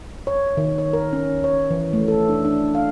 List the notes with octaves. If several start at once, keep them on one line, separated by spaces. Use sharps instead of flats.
C#5
D#3
C#5
A#4
C#4
C#5
E3
A3
A4
D4
D4
F5